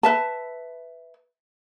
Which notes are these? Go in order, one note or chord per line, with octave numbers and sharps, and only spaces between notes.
B4 E5 A5